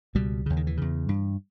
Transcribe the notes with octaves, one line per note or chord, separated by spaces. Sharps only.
C#2 B2 G3
D#2 C#3
D#3
E3
E2 C#3
G2